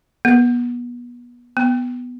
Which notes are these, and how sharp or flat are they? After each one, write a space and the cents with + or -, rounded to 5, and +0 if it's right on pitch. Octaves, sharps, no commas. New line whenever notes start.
B3 -30
B3 +0